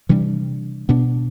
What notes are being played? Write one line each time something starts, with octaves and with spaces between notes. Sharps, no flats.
C3 E3 G3 D4
B2 B3 D4